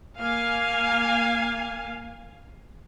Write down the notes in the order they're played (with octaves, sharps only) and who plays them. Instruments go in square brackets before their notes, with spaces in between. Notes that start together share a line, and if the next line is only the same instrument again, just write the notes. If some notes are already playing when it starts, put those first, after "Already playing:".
[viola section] A#3 F5 G#5